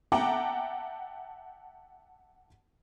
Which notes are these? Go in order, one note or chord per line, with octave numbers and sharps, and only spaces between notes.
E5 F#5 G5 A5 A#5 D6